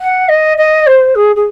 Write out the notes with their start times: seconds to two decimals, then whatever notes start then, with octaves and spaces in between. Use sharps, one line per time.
0.01 F#5
0.29 D#5
0.58 D#5
0.87 C5
1.15 G#4
1.36 G#4